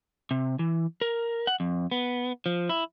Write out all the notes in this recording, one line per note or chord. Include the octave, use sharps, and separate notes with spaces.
C3
E3
A#4
F#5
F2
B3
F3
E4